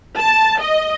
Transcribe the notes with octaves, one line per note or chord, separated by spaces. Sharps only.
A5
D#5